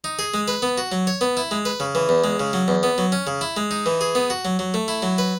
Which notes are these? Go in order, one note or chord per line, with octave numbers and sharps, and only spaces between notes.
D#4
G#4
G#3
B4
B3
F#4
F#3
C#5
B3
E4
G#3
B4
C#3
E3
E2
G#3
C#3
F#3
E2
B3
F#3
C#4
C#3
E4
G#3
D#4
E3
G#4
B3
F#4
F#3
F#3
A3
E4
F#3
B4